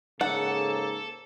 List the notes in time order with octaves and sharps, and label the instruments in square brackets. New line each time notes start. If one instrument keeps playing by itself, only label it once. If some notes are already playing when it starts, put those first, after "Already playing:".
[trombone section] G#2 C#3 A#3 [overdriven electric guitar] A4 [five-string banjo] F#5